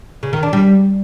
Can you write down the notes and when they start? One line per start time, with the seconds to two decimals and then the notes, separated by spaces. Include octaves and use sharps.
0.23 C#3
0.33 D#3
0.43 D4
0.53 G3